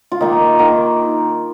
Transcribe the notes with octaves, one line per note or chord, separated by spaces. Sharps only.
F4
D#3 A#3 D#4
D#3 A#3